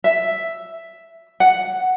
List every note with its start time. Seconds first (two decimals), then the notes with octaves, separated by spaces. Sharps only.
0.04 E5
1.40 F#5